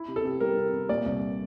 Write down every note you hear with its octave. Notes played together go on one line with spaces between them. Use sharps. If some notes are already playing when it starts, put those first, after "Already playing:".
Already playing: E4
C3
A4
C3
G3 A#4
C3
C3
A#2 D5
C2